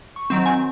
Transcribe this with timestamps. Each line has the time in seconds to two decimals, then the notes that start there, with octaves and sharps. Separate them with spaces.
0.16 C#6
0.30 D#3 F#3 C4 C6
0.46 G#5